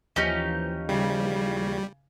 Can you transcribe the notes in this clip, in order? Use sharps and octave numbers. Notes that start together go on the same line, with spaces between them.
D#2 E3 F3 C#4 D#4 G4
C#3 G3